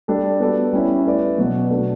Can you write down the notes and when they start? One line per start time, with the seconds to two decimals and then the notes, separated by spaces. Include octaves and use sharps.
0.08 G3 D4 A4
0.40 B3 F#4 A4 D5
0.73 G3 C#4 E4
1.06 A3 E4 B4 D5
1.38 B2 F#3 B3 F#4 B4
1.71 B2 A3 D4 F#4